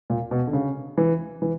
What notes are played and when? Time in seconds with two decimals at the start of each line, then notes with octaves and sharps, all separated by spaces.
0.10 A#2
0.31 B2
0.47 D3
0.53 C#3
0.98 E3
1.42 E3